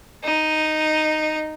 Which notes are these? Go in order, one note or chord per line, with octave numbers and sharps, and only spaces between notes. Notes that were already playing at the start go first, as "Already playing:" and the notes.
D#4